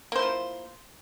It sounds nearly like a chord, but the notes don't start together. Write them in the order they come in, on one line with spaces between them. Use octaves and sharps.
A#3 C5 E4 F4